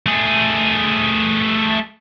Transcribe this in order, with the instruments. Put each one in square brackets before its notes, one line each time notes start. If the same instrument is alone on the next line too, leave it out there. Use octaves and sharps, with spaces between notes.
[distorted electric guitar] A3 G#4